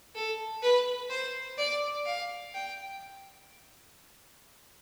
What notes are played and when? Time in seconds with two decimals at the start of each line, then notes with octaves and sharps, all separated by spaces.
0.15 A4
0.62 B4
1.10 C5
1.58 D5
2.06 F5
2.54 G5